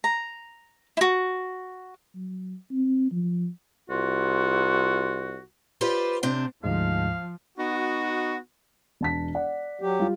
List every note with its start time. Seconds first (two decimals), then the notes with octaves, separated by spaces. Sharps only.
0.04 A#5
0.97 E4 F#4
2.15 F#3
2.71 C4
3.12 F3
3.90 C2 F4 F#4
5.81 F4 G4 B4 C5 D5
6.23 C3 C4 D4
6.64 D2 G#2 F3 G#3 F5
7.58 B3 D#4 F#4
9.01 E1 A5 B6
9.35 D5 F#5
9.81 F#3 G4
9.99 G3 F4